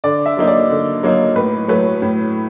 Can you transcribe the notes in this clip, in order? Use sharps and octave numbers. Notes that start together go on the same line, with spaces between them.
D3 D5
E5
F#3 A#3 D#4
D5
D3
F#3 A#3 D#4
A2 B4
F#3 A3 B4
A2